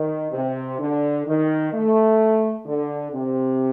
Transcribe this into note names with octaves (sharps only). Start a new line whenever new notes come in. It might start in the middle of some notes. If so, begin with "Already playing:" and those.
Already playing: D#3
C3
D3
D#3
A3
D3
C3